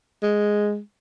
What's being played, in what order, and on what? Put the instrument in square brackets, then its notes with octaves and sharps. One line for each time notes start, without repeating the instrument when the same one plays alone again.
[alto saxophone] G#3